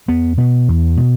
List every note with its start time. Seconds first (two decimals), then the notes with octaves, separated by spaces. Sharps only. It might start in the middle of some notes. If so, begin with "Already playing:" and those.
0.08 E2 B3
0.38 B2 B3
0.68 E2
0.97 B2